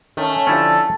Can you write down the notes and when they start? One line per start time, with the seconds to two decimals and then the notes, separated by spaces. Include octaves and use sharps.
0.17 D#3 A3 C#4
0.47 D3 F3 C#4 D4 E4 G4 A4